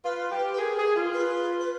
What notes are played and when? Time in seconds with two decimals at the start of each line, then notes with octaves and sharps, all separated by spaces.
0.04 F4 B4
0.31 G4
0.53 B4
0.59 G#4 A#4
0.77 G#4
0.96 F4
1.14 B4
1.59 B4